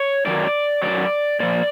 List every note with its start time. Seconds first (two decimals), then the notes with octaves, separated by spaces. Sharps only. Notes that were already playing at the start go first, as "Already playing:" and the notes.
Already playing: C#5
0.26 F#2 D#3 F#3 D5
0.82 F#2 D#3 F#3 D5
1.40 A#2 F3 D5